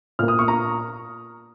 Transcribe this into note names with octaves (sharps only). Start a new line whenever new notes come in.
A#2 A#3 F6
D#6
C#6
A#5